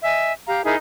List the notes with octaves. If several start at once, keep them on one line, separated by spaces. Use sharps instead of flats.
D#5 E5 G#5
G4 F5 A#5
D#4 E4 G#4 A#4